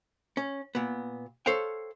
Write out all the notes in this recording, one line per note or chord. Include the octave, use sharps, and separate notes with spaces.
C#4
A#2 B3
A4 C5 C#5 F5 G5